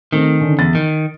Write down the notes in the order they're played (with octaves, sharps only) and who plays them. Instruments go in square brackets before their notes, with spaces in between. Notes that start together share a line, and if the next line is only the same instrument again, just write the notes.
[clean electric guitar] D#3 [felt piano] A3 C4
[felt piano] D3 C#4
[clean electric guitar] E2 [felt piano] A6
[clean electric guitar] D#3